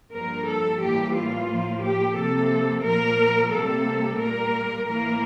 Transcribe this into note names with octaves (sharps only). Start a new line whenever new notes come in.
G2 F3 A#3 A#4
A4
A2 E3 G3 A#3 G4
F4
A2 F3 A#3
G4
C3 F3 A#3 A4
A#2 F3 A#3 A#4
C3 G3 A#3 A4
A#2 G3 A#3 A#4
A2 E3 A#3 A#4